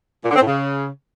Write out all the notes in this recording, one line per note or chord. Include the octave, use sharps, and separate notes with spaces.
A#2
D3
C4
A2
C#3